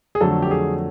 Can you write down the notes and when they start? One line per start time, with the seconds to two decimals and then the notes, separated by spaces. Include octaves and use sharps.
0.15 G#4
0.21 F2 D3 F#3 A3 A4
0.42 G4
0.51 G#4